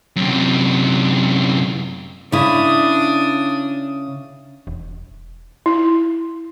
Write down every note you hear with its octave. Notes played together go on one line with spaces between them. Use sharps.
F#2 C3
C#3 D4 E4 D#6
E1
E4